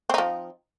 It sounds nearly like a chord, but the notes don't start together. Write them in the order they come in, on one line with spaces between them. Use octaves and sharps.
C4 D#4 F3